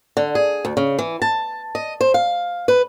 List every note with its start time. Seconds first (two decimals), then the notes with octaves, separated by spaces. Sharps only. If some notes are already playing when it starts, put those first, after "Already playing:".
0.17 D3
0.35 G#4
0.65 D2
0.77 C#3
0.99 E3
1.22 A5
1.75 D#5
2.01 C5
2.14 F5
2.68 B4